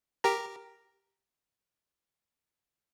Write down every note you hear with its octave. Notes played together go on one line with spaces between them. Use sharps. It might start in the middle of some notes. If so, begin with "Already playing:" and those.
G4 A#4 A#5